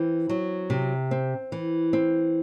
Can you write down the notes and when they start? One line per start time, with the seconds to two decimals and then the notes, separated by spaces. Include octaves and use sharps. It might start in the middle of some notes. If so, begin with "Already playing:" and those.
Already playing: E3 C4
0.29 F#3
0.70 C3
1.11 C4
1.52 E3
1.93 C4